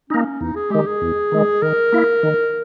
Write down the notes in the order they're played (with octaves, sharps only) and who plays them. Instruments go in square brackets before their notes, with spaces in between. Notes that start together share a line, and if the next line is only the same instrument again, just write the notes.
[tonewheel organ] A#3 D#4 [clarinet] C#4
[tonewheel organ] E2 [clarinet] D#4
[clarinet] G#4
[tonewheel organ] D#3 G#3 [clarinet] G4
[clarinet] G#4
[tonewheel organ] E2
D#3 G#3
[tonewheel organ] D#3 [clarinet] A#4
[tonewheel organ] A#3 E4
D#3